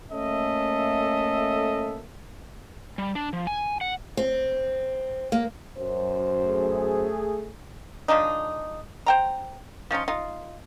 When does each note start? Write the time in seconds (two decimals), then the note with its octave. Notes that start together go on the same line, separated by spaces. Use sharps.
0.12 A3 A#3 C#4 A4 D#5 E5
2.98 G3
3.15 D4
3.33 F3
3.47 G#5
3.81 F#5
4.17 C4
5.32 A#3
5.78 F#2 C5
6.47 A3 G#4
8.08 F3 G#3 D4 D#4
9.06 C5 G5 A#5
9.91 F3 C#4 D#4 F4
10.08 D#4 F4